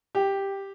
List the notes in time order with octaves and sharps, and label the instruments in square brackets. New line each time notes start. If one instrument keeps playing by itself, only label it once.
[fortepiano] G4